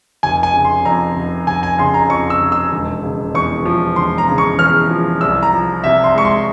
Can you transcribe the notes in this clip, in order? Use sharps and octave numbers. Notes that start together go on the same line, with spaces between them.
F1 G#5
G#5
C#3
C6
F2 A#5
F1
F1 G#5
G#5
C#3 C6
A#5
F2 C#6
E6
F1
E6
E1
C#3
E2 C#6
F3
E1 C6
A#5
C#3
C#6
E2 F6
F3
C2 E6
A#5
F3
C3 E5
C6
G#3 C#6
C6